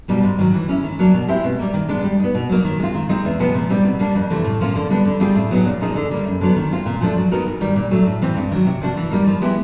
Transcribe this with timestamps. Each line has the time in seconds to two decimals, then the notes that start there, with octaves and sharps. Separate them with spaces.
0.08 B2 G3 A#3 D#4
0.23 G#2
0.39 D#3 F#3
0.54 E3
0.68 G#3 C#4 E4
0.84 D#3
0.99 F#3 A#3 D4
1.14 B2
1.28 G#3 C4 E4 G4
1.44 B2
1.59 G3 A#3
1.74 D#3
1.89 G#3 B3 D4
2.04 G3
2.19 B3 D#4
2.35 B2
2.49 F#3 A#3 D#4
2.65 D#3
2.79 G#3 C4 F4
2.95 D#3
3.09 G#3 C4 D#4
3.25 E2
3.39 C3 F3 G#3 B3
3.54 A#2
3.70 G3 C4 D#4
3.85 B2
3.99 G3 A#3 D4
4.15 F2
4.30 C3 E3 A3
4.44 A2
4.60 F3 A#3 C#4 F4
4.76 D3
4.90 G3 B3 D4
5.05 D3
5.20 G3 C4 F4 G#4
5.35 A2
5.51 F#3 B3 D#4 G#4
5.65 A#2
5.81 F3 A#3 D#4 G#4
5.95 D3
6.11 G3 A#3
6.25 F#2
6.41 D3 F#3 B3
6.56 D#3
6.71 G#3 C4 F4
6.86 A#2
7.01 F3 A3 D4
7.16 F#3
7.31 B3 D#4 F#4 A#4
7.46 G#2
7.61 D#3 G3
7.76 A#2
7.91 F#3 A3 D4
8.06 A2
8.22 E3 G#3 C4
8.37 G2
8.51 D#3 F#3
8.66 C3
8.82 F3 A#3 D4 F#4
8.97 E3
9.11 G3 A#3 D#4
9.27 F3
9.41 G#3 B3 E4 G4